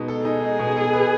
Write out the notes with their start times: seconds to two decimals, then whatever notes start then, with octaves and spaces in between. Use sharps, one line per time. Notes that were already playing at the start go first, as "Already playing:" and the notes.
Already playing: B2 G#3 D#4
0.08 A4
0.25 D#4 G#4
0.43 G#3
0.59 B2
0.76 A4
0.93 B4